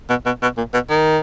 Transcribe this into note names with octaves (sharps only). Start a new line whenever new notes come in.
B2
B2
B2
A#2
B2
D#3